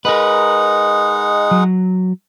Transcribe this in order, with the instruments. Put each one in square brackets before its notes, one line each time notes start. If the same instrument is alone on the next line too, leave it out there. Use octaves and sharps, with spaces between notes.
[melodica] G#3 D#4 F#5 [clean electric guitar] A#4 B4
[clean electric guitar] F#3